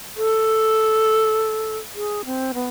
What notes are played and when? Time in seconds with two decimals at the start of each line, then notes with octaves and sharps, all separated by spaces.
0.17 A4
1.95 G#4
2.25 C4
2.54 B3